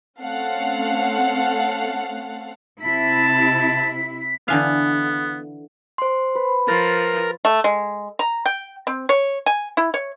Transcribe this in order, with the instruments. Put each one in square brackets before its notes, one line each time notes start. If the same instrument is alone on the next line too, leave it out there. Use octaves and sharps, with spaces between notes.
[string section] A3 C4 C#4 A4 F5 F#5
[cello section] C3 E4 [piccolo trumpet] A5 [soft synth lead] B6
[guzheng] D3 E3 F5 [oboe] B3
[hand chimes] C5 C6
[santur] B4
[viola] F3 [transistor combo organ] A#4 [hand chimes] A6
[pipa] A3
G#3
A#5
G5
C4
C#5
G#5
E4
C#5